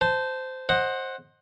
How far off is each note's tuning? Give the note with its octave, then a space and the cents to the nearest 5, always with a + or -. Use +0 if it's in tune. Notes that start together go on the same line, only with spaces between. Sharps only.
C5 -15 A5 +0
C5 +20 D#5 +0 F#5 +0